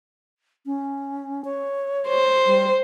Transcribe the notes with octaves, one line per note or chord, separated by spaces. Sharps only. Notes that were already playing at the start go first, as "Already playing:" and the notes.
C#4
C#5
C5
G3